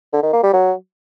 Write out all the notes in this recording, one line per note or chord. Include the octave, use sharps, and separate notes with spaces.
D3
D#3
A#3
G3
F#3